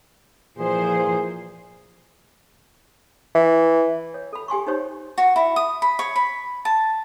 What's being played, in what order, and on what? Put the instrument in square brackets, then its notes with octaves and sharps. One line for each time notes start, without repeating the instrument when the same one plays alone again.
[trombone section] A#2 E3 G#4 [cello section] F3 C5
[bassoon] E3
[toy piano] C#5
A4 B5
G4 G#5 C6 C#6
D#4 G4 C5 C#5
[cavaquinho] F#4
E4
D#6
B5
C#5
B5
A5